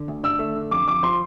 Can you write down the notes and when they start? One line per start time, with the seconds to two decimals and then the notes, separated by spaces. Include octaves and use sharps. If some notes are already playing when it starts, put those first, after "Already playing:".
Already playing: D3
0.08 D2
0.24 D4 E6
0.39 A3
0.56 D3
0.71 F2 D6
0.87 F2 D6
1.03 F3 C6